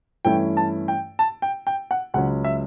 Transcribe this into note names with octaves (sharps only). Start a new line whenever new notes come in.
G2 E3 A3 C#4 E4 G5
A5
G5
A5
G5
G5
F#5
C#2 C#3 F#3 C#4 F#5
E5